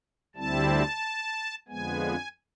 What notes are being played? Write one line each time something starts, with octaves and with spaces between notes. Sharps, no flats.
D2 D3 G3 C4 E4 A5
F2 D3 F3 G#3 B3 G#5